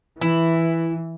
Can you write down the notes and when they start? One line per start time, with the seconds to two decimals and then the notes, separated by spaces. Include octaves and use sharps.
0.21 E3 E4